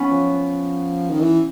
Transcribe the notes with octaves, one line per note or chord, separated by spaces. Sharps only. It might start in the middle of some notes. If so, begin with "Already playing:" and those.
Already playing: B3 C#4
F3
F3
D#3
E3